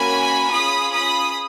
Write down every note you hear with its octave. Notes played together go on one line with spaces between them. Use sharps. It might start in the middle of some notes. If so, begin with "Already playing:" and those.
Already playing: A#3 C#4 F#4 G#5 B5
C#4 F4 G#4 B5 D#6
B5 D#6